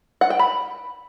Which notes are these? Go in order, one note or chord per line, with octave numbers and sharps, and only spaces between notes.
F#5
G5
B5